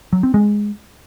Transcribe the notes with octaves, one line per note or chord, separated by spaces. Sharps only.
F#3
C4
G#3